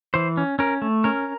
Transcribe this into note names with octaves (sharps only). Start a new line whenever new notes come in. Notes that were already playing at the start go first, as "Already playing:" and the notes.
E3 C5
C#4
C#4 A#4
A3
C#4 A#4